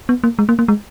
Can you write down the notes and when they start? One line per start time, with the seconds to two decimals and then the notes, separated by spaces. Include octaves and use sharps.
0.09 B3
0.24 A#3
0.39 G#3
0.49 A#3
0.59 A#3
0.68 G#3